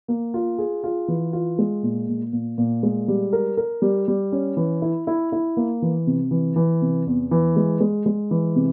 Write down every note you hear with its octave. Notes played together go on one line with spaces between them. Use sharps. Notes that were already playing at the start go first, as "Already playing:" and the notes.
A#3
F4
G#4
F4
E3
F4
G#3
A#2
A#2
A#2
A#2
G#3
G3
A#4
A#4
G3
G3
C#4
E3
E4
E4
E4
A#3
E3
C3
E3
E3
C3
E2
E3
G#3
G#3
G#3
E3
C3